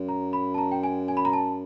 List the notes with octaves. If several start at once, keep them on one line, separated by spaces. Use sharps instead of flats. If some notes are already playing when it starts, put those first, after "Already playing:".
Already playing: F#2
A#5
B5
A5
A#5
G5
G#5
G#5
B5
A#5
A5